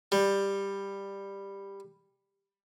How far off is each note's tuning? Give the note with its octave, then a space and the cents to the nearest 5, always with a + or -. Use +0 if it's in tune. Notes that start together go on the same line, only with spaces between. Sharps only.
G3 +10